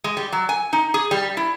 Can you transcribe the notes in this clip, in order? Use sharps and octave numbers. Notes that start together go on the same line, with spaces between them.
G#3
G3
F#3
G#5
D#4
G#4
G3
E4